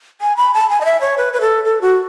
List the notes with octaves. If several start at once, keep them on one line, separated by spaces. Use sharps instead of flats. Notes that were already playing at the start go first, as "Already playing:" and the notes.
G#5
B5
A5
G#5
D#5
E5
C#5
B4
B4
A4
A4
F#4